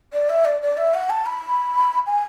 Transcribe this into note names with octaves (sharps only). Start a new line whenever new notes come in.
D5
E5
D5
D5
E5
F#5
A5
B5
G#5